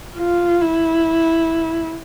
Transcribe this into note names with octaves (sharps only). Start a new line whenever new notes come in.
F4
E4